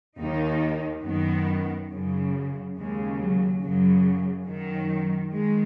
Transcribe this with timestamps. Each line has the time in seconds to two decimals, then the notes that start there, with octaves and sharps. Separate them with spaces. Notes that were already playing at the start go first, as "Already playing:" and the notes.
0.19 D#2 D#3 D#4
1.04 F#2 D#3 B3
1.89 F#2 C#3
2.76 D#2 C#3 G#3
3.19 F#3
3.61 F#2 C#3 F#3
4.47 F#2 D#3 F#3
5.32 D#3 G#3